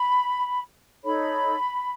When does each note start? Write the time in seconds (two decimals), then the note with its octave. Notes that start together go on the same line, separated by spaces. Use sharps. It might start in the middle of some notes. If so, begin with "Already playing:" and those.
Already playing: B5
1.04 D#4 A4 C#5 B5